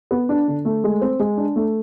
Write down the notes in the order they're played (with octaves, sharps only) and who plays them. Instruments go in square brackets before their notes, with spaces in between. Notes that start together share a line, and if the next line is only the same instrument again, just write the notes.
[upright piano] B3
D4
D3
A3
G#3
C4
G#3
D4
A3